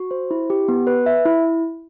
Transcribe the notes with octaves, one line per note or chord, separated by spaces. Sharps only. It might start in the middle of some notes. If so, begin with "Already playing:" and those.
Already playing: F#4
C5
E4
G4
B3
B4
E5
E4